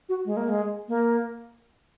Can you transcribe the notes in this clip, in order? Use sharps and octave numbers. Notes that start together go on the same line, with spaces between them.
F#4
G#3
A#3
G#3
A#3